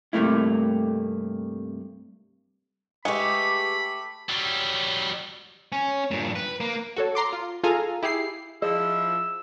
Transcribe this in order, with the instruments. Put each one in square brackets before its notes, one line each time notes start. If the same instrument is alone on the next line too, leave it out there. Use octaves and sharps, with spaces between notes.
[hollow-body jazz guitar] G2 C3 D#3 A3 A#3 E4
[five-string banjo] G#3 [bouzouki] A3 G4 [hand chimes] B4 C#6 C#7 [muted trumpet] B5
[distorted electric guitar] F#3 G3
C#4
G2 A#2
B4
A#3
[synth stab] F#4 A4 C#5
A#5 C6 D6
F4
F4 G#4 A4 F5 G#5 A#5
E4 G4 G#4 C7
[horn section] F3 E4 [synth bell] G#4 [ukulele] D#5 [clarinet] E6